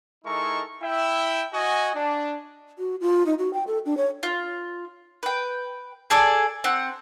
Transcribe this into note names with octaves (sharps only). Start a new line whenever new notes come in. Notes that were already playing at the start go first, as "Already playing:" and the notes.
G#3 D#4 E4 A4 A#4 C#6
E4 E5 G5
F#4 D#5 G#5
D4
F#4
F4
D#4
F#4
G5
A4
D4
C#5
F4
B4 G5
G#4 A4 D5 G#5
C4 F#5